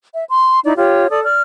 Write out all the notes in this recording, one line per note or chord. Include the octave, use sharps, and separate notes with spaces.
E5
C6
D#4 E4 D5
F4 G4 C#5
A4 D5 D#6
D5 F6